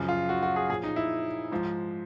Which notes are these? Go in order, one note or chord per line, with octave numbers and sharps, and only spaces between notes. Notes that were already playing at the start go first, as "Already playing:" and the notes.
Already playing: F#2 C#3 F3
F4
F#4
F#4
G#4
A#2 F3 G#4
D#4
E4
G#2 F3